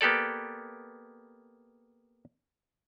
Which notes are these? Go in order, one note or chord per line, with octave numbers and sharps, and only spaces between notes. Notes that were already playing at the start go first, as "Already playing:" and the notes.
A#3 B3 G4 A4 D5